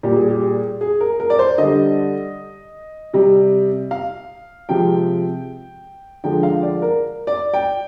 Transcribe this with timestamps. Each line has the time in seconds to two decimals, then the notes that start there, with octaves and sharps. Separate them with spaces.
0.03 A#2 G3 G4
0.16 G#4
0.29 G4
0.42 G#4
0.81 G#4
1.01 A#4
1.20 A#4
1.30 D5
1.39 C5
1.58 D3 G3 D#5
3.14 C3 G3
3.91 F5
4.69 C3 F3 G#3 G5
6.24 D3 F3 G#3 G5
6.43 F5
6.63 D5
6.82 A#4
7.27 D5
7.54 G5